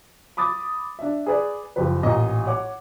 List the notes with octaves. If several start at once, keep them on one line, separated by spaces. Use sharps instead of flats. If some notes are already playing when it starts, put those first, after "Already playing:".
B5 D6 D#6 A6
D4 E5
G#4 B4 D5
F#1 F3 G4 B4
A1 A#2 D#5 A#5
C#5 F#5 D6